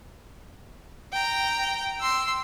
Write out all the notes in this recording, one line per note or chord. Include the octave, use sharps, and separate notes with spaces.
G5 A#5
C6 E6